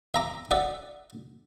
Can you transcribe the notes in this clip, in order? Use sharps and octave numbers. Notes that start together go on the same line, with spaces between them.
E5 A#5 D6
D5 E5 F#5